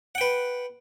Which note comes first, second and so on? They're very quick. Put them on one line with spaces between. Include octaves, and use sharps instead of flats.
F#5 G5 B4